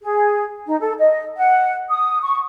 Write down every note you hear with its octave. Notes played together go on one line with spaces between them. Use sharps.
G#4
D#4
A4
D#5
F#5
D#6
C#6